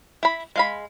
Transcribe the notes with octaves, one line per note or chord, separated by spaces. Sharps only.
E4 B5
G#3 F5 B5